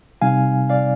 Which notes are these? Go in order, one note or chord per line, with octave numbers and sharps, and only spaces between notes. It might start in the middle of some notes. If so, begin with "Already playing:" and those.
C3 G3 C4 D#4 F5 G#5
D5 F5